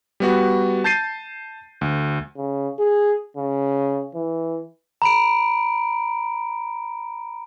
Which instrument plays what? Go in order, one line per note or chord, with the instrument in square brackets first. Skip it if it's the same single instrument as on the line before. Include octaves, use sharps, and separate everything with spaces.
[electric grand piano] G3 B3 F#4
A5 G6 A6 C7 D#7
D2
[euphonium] C#3
G#4
C#3
E3
[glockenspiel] A#5 B5 D7